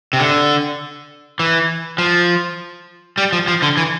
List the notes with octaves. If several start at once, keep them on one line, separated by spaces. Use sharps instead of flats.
C3
D3
E3
F3
G3
F3
F3
D3
E3